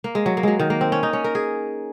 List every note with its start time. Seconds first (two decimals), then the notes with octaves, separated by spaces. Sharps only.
0.04 A#3
0.15 G#3
0.26 F#3
0.37 A#3
0.43 F#3 G#3
0.59 D#3
0.70 A#3
0.81 C4
0.92 C#4
1.03 D#4
1.13 C#4
1.24 A#4
1.35 G#4